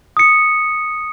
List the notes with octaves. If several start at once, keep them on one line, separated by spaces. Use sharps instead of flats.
D#6 C#7